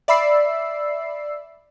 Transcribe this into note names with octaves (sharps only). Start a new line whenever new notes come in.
D5 E5 B5 E6 C7